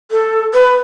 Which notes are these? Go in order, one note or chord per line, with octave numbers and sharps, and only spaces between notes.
A4
B4